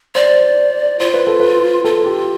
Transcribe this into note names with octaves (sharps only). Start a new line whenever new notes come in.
C5 D5
F4 C5
B4
A4
B4
F4 A4
G4